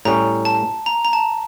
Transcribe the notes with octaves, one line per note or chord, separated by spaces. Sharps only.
A2 G3 C#4 A#5
A5
A#5
A#5
A5